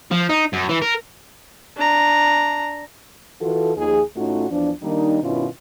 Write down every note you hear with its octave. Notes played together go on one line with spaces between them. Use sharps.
F3
D#4
F#2
E3
A#4
D4 A#5
E3 F4 F#4 A4
D#2 F3 G#4
A2 A3 C#4 D#4 F4 F#4
E2 F3 D4
D#3 G3 A#3 D4 D#4
G2 B2 D#3 C#4 E4 F4